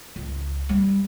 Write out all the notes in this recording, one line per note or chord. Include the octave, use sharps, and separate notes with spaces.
C#2
G3